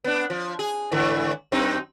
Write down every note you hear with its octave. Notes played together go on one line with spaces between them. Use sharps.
B3 D4
F3
G#4
G#2 D3 E3
F#2 C4 D#4